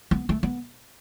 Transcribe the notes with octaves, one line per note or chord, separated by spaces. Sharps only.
B3
A3
B3